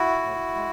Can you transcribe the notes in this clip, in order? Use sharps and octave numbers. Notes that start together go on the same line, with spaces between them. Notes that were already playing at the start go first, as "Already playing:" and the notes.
Already playing: E4 F#4
A2
G#3